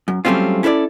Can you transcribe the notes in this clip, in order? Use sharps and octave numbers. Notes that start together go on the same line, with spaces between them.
F#2
F#3 G3 A3 C4 C#4 F4
C#4 E4 A4 B4 D5